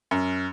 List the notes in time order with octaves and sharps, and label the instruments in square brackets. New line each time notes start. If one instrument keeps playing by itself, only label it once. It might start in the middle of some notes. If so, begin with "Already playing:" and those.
[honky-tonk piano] F#2